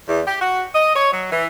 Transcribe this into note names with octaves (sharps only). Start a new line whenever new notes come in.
E2
G4
F#4
D#5
C#5
F#3
E3